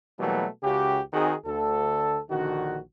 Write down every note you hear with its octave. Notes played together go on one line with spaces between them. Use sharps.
B2 E3 F#3 G3 A3 A#3
C#2 C#3 F#4 G4
D#3 C4 D#4 F#4 G#4
D2 A4
A#1 D3 D#3 F#4